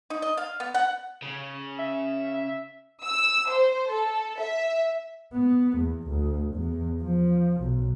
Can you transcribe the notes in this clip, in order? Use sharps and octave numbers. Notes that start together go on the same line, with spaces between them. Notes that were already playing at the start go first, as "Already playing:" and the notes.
D#4
D#5
F5
B3
F#5
C#3
E5
E6
C5
A4
E5
B3
E2
D2
E2
F3
B1